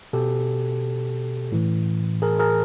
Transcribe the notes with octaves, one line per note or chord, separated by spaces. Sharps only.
B2 G4 A4
A2 E3
G#4 A#4
G#4 A#4